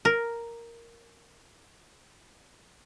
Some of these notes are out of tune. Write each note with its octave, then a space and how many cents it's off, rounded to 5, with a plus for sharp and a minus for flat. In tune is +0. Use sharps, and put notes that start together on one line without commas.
A#4 +0